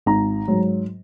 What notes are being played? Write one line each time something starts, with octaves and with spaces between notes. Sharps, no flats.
G#1 A#5
G#2 F#3